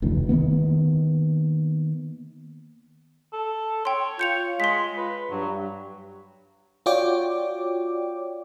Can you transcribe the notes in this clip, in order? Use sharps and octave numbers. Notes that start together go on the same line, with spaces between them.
F1 D2 E3
D#3 E3 A#3 B3
A4
C#5 G5 C6
F4 G6 C#7 F7
G#3 C6 B6
B4
G2 F#3
F4 F#4 C#5 D5 G5 D6